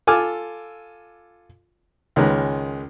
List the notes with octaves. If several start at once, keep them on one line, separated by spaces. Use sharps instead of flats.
F4 A4 G#5 D6 E6 F6
C#2 D#3 G#3 C#4 A#4 B4